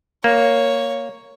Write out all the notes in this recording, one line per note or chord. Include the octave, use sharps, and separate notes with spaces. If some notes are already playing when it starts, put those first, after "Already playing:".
A#3 C#5